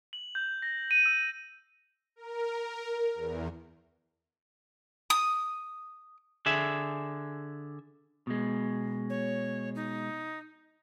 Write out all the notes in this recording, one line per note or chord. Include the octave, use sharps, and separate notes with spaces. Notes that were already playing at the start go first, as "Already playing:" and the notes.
F#7
G6
A#6
D#7
E6
A#4
E2
D#6
D3 G#4 E5
B2 G#3
C#5
D#4